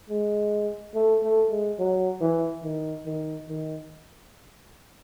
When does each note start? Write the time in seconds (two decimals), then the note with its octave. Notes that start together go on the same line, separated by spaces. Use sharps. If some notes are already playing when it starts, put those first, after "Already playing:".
0.10 G#3
0.95 A3
1.23 A3
1.51 G#3
1.79 F#3
2.21 E3
2.64 D#3
3.06 D#3
3.49 D#3